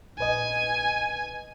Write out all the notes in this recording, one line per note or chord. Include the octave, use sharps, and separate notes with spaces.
A#1 B4 D#5 G#5